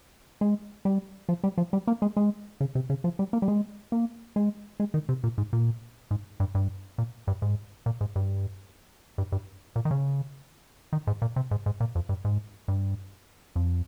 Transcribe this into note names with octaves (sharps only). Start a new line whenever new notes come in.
G#3
G3
F3
G3
F3
G3
A#3
G#3
G#3
C#3
C3
C#3
F3
G3
A#3
G3
G#3
A#3
G#3
G#3
D#3
C3
A#2
G#2
A#2
G#2
G2
G2
A#2
G2
G#2
A#2
G#2
G2
G2
G2
A#2
D#3
C#3
D#3
G#2
A#2
C3
G#2
G#2
A#2
F2
G2
G#2
G2
F2